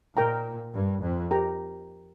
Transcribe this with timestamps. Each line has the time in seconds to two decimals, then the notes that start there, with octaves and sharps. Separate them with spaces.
0.16 A#2 A#4 G5 A#5
0.74 G2
1.03 F2
1.31 G4 A#4 G5 A#5